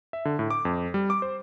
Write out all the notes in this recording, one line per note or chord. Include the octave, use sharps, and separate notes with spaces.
E5
D3
A2
D6
F2
G3
D6
C5